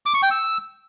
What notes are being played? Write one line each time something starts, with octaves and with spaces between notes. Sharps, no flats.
D6
C#6
G5
E6